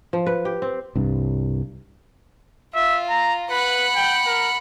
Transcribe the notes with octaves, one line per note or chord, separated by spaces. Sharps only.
F3
B4
G4
C4
C2 G2
F4 E5
A#5
B4 F#5 B5
G5
A#4